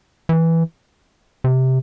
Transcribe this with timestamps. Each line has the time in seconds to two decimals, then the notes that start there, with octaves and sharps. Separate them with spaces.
0.29 E3
1.44 C3